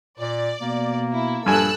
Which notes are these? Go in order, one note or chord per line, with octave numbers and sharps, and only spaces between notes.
A#2 D5
B2 A#3
E4
A#1 G2 A4 G#5 E6 F#6